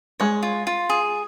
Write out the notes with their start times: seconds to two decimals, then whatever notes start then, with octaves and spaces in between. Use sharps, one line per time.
0.20 G#3 C#5
0.43 F4
0.67 F4
0.90 G#4